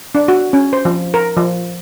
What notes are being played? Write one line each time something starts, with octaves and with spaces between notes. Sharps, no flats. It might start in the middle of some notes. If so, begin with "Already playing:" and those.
D4
F#4
C#4
C5
F3
A#4
F3